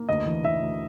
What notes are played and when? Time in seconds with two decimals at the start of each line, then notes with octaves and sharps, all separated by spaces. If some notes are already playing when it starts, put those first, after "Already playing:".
Already playing: A#3
0.09 D2 D#5
0.26 E3
0.44 E3 E5
0.62 D2